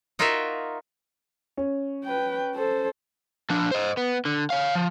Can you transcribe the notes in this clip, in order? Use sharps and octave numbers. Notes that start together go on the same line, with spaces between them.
D#4 F4 F#4 A#4 D#5 E5
C#4
B4 G5
A4 C5
F3 D4
C5 D#5
B3
D3
C#5 F5
F3